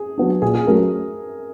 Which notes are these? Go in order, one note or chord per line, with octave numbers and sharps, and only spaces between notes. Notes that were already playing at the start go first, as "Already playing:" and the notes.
Already playing: G#4
F#3 B3 D4
A#2 G#4
G#4
F#3 A3 C#4 F#4 A#4